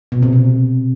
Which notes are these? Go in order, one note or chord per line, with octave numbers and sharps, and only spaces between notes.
B2
C3
B2